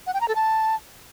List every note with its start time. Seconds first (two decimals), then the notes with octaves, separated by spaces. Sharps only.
0.07 F#5
0.14 G5
0.21 A#5
0.28 A4
0.35 A5